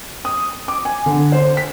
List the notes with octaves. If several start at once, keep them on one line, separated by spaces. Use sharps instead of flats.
D#6
D6
G#5
D3
C5
B6